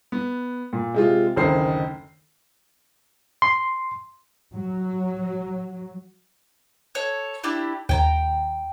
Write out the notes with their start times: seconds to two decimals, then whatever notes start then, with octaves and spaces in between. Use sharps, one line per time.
0.12 B3
0.73 A#2
0.94 C3 G#3 F4
1.36 F#1 D2 D#3 C5 C7
3.42 C6
4.53 F#3
6.95 A4 C#5
7.44 D4 E4 G4
7.89 D#2 G5 G#5 A#5